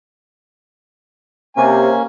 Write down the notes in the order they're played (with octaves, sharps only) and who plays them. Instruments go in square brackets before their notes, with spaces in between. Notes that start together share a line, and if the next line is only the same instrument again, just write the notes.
[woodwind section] C3 [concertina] A#3 C#4 [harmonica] G#5